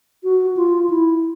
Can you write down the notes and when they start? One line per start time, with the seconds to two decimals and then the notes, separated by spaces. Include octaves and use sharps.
0.23 F#4
0.56 F4
0.90 E4